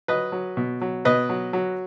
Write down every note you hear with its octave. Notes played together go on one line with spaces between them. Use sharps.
F#3 B4 D#5
F#3
B2
F#3
B2 B4 D#5
F#3
F#3